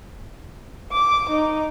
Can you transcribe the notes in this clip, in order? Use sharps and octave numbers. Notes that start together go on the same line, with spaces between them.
D6
D#4